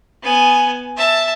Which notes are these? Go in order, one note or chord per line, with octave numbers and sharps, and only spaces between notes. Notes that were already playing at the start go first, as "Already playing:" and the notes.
B3 G#5
E5 A5